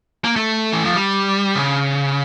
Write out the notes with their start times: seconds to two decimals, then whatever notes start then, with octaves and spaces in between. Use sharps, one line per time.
0.24 A#3
0.36 A3
0.72 E3
0.85 F3
0.95 G3
1.55 C#3